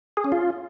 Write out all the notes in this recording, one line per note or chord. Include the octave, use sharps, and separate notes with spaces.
G#4
C#4
F4